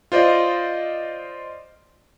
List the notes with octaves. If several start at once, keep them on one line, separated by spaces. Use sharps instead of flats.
F4 C5 D5 D#5